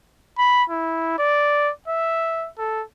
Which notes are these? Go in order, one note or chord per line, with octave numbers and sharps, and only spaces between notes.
B5
E4
D5
E5
A4